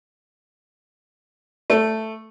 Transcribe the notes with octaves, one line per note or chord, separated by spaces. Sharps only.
A3